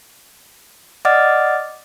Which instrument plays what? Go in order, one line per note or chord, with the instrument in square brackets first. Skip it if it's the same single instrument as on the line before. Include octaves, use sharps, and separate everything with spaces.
[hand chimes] D5 D#5 F#5 D6 F6 A6